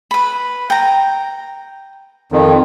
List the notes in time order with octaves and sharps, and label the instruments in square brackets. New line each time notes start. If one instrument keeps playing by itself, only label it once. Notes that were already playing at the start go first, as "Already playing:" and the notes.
[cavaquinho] B4 B5
G5 A#5
[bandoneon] F2 D#3